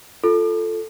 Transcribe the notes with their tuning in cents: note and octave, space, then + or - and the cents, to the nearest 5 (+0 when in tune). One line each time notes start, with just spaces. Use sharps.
F4 +0 A4 +0